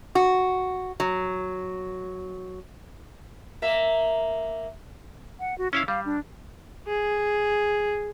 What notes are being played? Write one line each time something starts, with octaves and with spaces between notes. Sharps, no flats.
F#4
F#3
A#3 E5
F#5
F#4
C#4 E4 F5 E6
G3 F5
D4
G#4